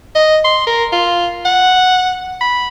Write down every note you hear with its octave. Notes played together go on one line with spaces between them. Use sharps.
D#5
C6
A#4
F4
F#5
B5